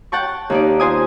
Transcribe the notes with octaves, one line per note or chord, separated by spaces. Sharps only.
F#5 G5 A5 C#6
D#2 D#4 D5
F4 C5 G#5 D#6